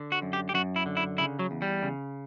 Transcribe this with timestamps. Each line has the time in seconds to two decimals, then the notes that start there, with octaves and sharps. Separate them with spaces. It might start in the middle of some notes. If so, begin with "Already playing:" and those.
Already playing: D3
0.12 F#4
0.22 F#2
0.33 G4
0.49 G4
0.54 F#2 F#4
0.76 E4
0.86 D3
0.97 E4
1.18 C#3 E4
1.39 F#3
1.51 E2
1.62 G3
1.83 C#3